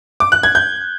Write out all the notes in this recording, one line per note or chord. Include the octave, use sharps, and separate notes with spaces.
D6
F#6
G#6
G6